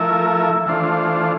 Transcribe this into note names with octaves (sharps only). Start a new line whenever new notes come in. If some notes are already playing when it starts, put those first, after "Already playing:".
Already playing: F3 A3 E4 A#4 E5
E3 A3 D4 F4 C5